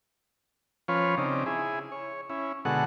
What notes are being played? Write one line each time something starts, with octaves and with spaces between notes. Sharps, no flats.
F3 C#4 F4 B4 C#5
C#3 C4 D4 D#4
E4 G#4
C#5
C#4 E4
B2 D3 G#3 F#4 A4 F#5